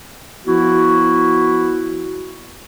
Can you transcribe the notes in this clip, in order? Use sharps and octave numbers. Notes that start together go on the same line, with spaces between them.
F3 B3 E4 F#4